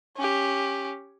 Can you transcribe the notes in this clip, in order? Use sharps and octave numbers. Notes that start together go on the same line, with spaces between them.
C#4 G4